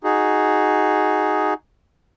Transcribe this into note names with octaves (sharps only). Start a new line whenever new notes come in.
D#4 F#4 G#4